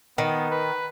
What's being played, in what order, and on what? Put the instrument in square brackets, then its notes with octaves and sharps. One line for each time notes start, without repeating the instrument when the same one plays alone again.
[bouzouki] D#3 [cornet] B3
[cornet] B4